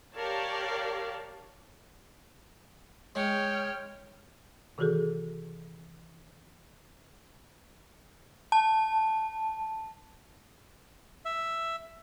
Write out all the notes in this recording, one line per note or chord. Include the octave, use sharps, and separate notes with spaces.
G4 A#4 C#5 D5 F5 A5
G#3 C#5 G5 F6
C3 D#3 E3 F#4 G#4 A4
A5
E5